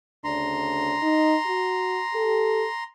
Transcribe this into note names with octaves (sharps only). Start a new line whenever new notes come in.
D2 C#3 D4 A#5 C6
D#4
F#4
G4 A4